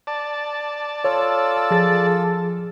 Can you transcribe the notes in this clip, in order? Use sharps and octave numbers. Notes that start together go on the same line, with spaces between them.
D5 A5
F4 A4 C#5 E6
F3 G#4 A6